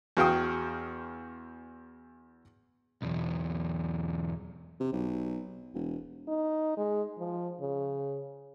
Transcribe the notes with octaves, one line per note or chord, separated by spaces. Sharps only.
E2 F#4 F5 G5 D#6
B1 E2
C3
B1
E1
D#4
G#3
F3
C#3